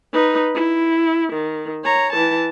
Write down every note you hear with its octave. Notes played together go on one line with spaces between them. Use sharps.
D#4 B4
E4
D#3
C#5 A#5
E3 A5